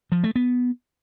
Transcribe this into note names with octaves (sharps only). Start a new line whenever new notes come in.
F3
A3
B3